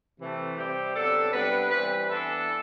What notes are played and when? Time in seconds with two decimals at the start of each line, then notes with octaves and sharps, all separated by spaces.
0.19 C3 E3 A3
0.56 C3 G3 C4 G4
0.94 C3 F#3 B3 D4 A4
1.32 C3 G3 B3 D4 B4
1.71 E3 G3 C4 B4
2.08 E3 B3 D4 A4